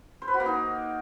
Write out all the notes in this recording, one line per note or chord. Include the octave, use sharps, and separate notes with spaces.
C5
B4
F#4
A#3
D#4